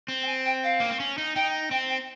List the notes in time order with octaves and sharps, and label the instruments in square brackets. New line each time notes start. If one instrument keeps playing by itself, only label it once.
[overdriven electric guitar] C4
[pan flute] G5
G#5
G5
F5
[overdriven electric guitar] A#3
C4
C#4
D#4
[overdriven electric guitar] D#4 [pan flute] G5
[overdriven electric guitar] C4 [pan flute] G5
[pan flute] G5